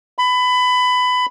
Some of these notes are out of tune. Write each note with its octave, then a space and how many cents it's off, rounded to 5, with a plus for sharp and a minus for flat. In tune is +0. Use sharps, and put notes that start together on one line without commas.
B5 +20